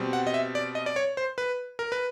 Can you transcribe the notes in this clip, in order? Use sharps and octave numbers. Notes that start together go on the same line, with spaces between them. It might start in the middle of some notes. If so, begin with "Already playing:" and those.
Already playing: B2 G3 C4
F#5
D#5
E5
D5
D#5
D5
C#5
C5
B4
A#4
B4